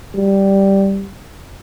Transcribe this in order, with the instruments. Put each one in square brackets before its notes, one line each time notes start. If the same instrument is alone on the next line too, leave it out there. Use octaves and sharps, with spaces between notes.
[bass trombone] G3